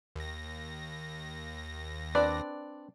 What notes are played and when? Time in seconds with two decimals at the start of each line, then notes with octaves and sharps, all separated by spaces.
0.16 D#2 A#6
2.15 C4 D4 B4 D5